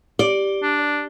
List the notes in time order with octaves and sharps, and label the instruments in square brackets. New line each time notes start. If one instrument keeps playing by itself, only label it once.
[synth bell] G4 [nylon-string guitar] D5
[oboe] D4